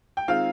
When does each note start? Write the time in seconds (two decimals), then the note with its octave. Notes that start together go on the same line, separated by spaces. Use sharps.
0.17 G5
0.28 D#3 G#3 C4 D#4 F4 F5